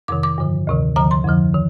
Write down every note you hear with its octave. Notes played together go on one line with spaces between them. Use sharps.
F2 C3 D#3 D6
D6
G2 D3 F3
D2 C3 D#3
D2 D3 F3 A#5
C6
F2 D3 F3
D#3